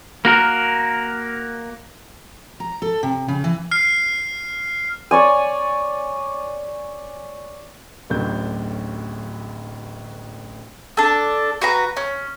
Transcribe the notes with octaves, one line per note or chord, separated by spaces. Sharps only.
A#3 F#4 A#4
A#5
A4
C3
C#3
E3
F6 C7
C#5 D5 G#5
D1 A1 D2 F#3 G6
D4 A4
F#4 B4 A#5
C#4